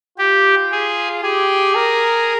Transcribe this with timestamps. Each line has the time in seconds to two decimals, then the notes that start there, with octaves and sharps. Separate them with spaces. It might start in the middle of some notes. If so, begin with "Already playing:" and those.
0.18 F4 G4
0.72 G#4
1.23 G4 G#4
1.75 A#4